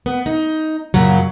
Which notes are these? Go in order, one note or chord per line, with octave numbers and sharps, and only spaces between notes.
B3
D#4
F#2 A#2 C#3 F#3